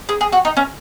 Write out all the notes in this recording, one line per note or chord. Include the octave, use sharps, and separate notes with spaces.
G#4
G#4
F#4
D#4
C#4